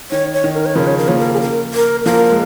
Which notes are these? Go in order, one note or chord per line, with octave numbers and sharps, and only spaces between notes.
D#3 C#5
C#5
D#3
A#4
C#5
C#3 F3 A#4
C#5
A#4
F3 A#3 C#5
A#4
G#4
A#4
A#4
F3 A#3 A#4
G#3